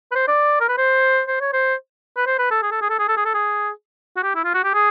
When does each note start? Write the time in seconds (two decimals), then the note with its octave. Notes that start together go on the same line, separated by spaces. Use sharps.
0.11 B4
0.15 C5
0.28 D5
0.61 A#4
0.69 B4
0.78 C5
1.27 C5
1.41 C#5
1.53 C5
2.17 B4
2.27 C5
2.39 B4
2.51 A4
2.62 G#4
2.71 A4
2.82 G#4
2.90 A4
2.99 G#4
3.08 A4
3.17 G#4
3.25 A4
3.34 G#4
4.17 F#4
4.23 G4
4.35 E4
4.44 F4
4.54 F#4
4.64 G4
4.74 G#4